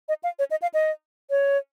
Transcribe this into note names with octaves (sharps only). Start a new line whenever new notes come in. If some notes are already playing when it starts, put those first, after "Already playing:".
D#5
F5
C#5
D#5
F5
D#5
C#5